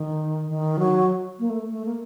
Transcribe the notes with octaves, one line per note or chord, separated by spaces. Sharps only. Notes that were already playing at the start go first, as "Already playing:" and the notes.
Already playing: D#3
D#3
F#3
A#3
A3
A3
A#3